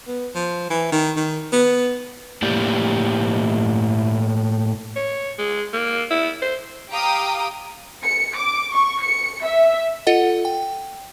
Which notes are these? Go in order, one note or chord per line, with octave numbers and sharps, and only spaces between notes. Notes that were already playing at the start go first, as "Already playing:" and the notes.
B3
F3
E3
D#3
D#3
B3
A2 A#3 E4 G4 C5 D5
C#5
G#3
A#3
E4
C5
G4 F5 G5 A#5 D#6
C#7
D6
C#6
C#7
E5
F4 A4 D#5 F#5
G5